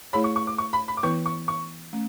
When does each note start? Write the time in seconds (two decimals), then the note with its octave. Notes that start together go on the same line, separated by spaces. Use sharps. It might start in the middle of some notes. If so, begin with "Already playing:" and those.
0.13 A3 E4 G#4 C#5 B5
0.24 C#6
0.36 C#6
0.47 D6
0.58 C#6
0.73 B5
0.88 B5
0.97 D6
1.03 E3 B3 E4 B4 C#6
1.26 C#6
1.48 C#6
1.93 A3 C#4